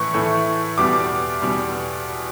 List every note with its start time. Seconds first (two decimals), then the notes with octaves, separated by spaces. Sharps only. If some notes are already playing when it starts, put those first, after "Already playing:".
Already playing: A2 E3 A3 C#6
0.14 A2 E3 A3
0.78 E2 B2 G3 D6
1.42 E2 B2 G3